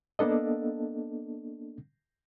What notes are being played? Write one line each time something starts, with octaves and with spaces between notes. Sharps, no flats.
A#3 B3 D4 A4 D#5